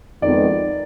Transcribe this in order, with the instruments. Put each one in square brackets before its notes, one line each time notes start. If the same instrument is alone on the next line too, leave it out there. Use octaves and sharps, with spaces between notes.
[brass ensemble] F2 D#3 G#3 B3 [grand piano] D5